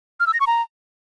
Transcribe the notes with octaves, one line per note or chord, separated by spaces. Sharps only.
F6
E6
A#6
C#6
A#5